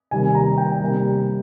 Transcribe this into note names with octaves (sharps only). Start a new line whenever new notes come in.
C3 D#3 G3 A#3 G#5
A#5
G5
C3 G3 A#3